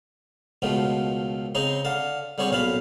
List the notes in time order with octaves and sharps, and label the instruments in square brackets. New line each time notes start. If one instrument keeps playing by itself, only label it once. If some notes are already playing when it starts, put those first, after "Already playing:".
[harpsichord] C#2 B2 D#3 F3 A3
C#3 C4 D#4 G#4 A#5
D3 F5 A5
D3 G3 C4 G#4 C#5 C#6
B1 A#2 C#4 F5 A5 B5